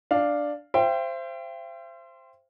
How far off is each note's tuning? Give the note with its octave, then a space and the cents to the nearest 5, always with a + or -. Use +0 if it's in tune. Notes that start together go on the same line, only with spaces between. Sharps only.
D4 +0 F5 +0
C5 +0 E5 +45 G5 +0